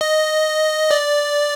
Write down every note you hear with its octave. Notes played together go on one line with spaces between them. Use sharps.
D#5
D5